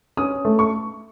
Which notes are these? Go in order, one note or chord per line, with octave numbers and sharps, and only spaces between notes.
C#4 D#6
A3
C#6